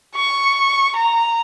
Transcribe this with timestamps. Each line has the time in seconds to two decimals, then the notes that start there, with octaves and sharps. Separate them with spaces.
0.15 C#6
0.96 A#5